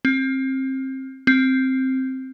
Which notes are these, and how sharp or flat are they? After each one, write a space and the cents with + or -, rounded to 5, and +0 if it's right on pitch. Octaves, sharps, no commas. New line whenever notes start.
C4 +25
C4 +5